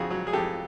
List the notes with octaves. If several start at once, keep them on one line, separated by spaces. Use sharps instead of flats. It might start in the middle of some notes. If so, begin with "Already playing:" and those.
Already playing: F2 D3 F#4 G#4
F#3
G#4
F2 G4 A4